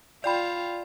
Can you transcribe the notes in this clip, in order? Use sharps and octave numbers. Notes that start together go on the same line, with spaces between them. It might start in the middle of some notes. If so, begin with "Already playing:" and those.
F4 D5 G5 B5